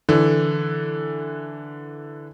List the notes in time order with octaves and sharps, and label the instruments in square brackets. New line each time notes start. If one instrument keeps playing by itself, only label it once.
[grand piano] D3 E3